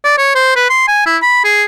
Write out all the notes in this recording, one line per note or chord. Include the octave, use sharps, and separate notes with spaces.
D5
C#5
C5
B4
C6
G#5
E4
B5
G#4